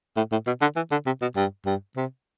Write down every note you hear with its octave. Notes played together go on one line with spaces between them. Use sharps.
A2
A2
B2
D3
E3
D3
C3
B2
G2
G2
C3